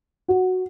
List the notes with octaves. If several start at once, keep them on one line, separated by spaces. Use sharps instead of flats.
F#4